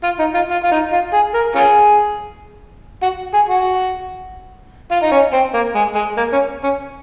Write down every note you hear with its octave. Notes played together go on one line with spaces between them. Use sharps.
F4
D#4
F4
F4
F4
D#4
F4
G#4
A#4
C#4 F4 G#4
F#4
G#4
F#4
F4
D#4
C#4
C4
A#3
G#3
G#3
A#3
C#4
C#4